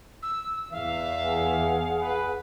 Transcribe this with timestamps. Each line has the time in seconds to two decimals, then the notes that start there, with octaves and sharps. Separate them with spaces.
0.22 E6
0.72 E2 E5 F5
1.21 G#4 F#5 G#5
2.01 B4